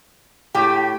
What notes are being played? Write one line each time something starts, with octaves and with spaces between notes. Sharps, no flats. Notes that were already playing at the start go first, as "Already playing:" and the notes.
A2 G4